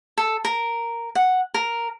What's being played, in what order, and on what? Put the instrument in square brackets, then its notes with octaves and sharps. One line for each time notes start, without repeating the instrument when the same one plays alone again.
[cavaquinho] A4
A#4
F#5
A#4